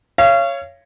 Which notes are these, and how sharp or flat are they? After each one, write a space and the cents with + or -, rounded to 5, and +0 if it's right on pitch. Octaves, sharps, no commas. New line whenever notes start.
C#5 +0 F5 -35